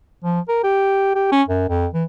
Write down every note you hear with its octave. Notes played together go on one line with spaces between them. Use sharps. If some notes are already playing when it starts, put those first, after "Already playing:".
F3
A#4
G4
G4
C#4
F#2
F2
E3